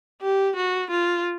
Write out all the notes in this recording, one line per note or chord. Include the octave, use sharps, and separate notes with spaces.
G4
F#4
F4